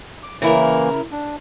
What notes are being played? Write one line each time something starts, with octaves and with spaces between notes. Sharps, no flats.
D6
C#3 E3 A#3 E4 A#4
D4